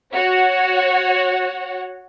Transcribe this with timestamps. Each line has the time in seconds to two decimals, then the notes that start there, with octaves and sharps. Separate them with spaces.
0.13 F#4 C#5 F#5